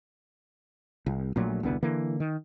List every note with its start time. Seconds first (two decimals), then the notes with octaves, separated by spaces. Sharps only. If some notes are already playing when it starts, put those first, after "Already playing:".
1.06 C2
1.36 A#1 A#2 F#3 A3
1.63 E1 C2 D3 B3
1.83 D3 E3 A#3
2.20 D#3